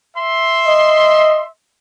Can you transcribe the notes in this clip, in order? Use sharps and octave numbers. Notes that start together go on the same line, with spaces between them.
E5 C6
D#5